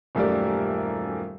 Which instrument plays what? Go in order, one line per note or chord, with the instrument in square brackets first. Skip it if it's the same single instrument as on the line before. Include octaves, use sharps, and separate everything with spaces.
[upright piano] D#1 F#2 A3 G4 A#4 D5